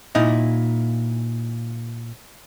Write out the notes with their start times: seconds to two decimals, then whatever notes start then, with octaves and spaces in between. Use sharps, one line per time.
0.15 A#2 D#4 E4